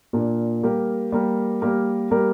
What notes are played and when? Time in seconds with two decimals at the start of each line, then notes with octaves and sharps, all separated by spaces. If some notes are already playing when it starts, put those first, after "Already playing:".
0.13 A#2 A#3 D4 A#4
0.63 G3 A#3 G4 A#4
1.12 G3 A#3 G4 A#4
1.62 G3 A#3 G4 A#4
2.11 G3 A#3 G4 A#4